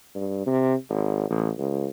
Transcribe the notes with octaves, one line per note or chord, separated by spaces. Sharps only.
G2
C3
G#1
A1
C#2